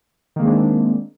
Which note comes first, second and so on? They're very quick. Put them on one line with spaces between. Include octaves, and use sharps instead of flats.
D#3 A#3 G#3 C4 D4